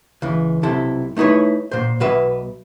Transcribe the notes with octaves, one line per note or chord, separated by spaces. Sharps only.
C#2 E3
B1 C3 E4 A4
A3 D#4 E4 B4 C#5
A#2 C5
B1 B2 B4 E5